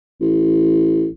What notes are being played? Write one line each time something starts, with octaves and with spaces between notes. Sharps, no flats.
A1